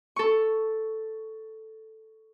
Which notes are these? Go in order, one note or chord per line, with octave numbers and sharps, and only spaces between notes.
A4 C#6